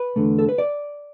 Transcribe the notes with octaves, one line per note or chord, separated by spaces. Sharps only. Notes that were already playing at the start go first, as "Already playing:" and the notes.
Already playing: B4
E2 D3 A3
A4
B4
D5